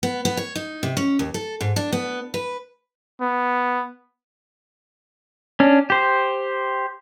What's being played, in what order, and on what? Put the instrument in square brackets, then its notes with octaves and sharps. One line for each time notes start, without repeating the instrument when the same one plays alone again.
[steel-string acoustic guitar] B3
B3
C#5
D#4
C3
C#4
D#2
A4
G#2
D4
B3
B4
[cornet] B3
[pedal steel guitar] C#4 D4
G4 C5